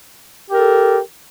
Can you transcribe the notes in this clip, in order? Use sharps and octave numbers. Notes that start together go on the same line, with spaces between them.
G4 A4 A#4